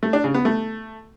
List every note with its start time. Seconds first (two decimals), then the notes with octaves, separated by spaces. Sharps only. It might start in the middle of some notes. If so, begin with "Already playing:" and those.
0.03 A3
0.13 D4
0.24 C#3
0.34 B3
0.45 A3